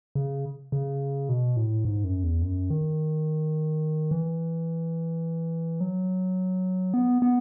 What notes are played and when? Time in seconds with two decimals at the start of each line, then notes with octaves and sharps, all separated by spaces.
0.15 C#3
0.72 C#3
1.29 B2
1.57 A2
1.85 G#2
2.04 F#2
2.23 E2
2.42 F#2
2.70 D#3
4.11 E3
5.81 F#3
6.94 B3
7.22 B3